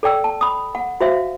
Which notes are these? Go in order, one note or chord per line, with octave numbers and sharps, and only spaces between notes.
A4 D5 G5 E6
A5
B5 D#6
F#5
F#4 C5 E5 F5